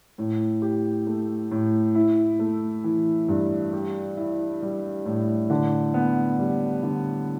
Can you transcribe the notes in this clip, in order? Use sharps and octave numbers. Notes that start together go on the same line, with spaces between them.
A2
G4
A3
A2
E4
A3
E3
G2
G4
E4
G3
A2
D3
B3
G3
D3